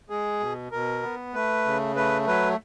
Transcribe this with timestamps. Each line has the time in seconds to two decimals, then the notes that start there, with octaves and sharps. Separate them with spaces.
0.10 G#3 G#4
0.40 B2
0.72 B2 A#4
1.03 B3
1.34 A3 B4
1.65 C#3
1.96 A3 B4
2.27 F#3 B4